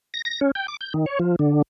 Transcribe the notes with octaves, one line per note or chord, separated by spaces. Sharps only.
A#6
A#6
C#4
G5
D6
G6
D#3
C#5
F3
D3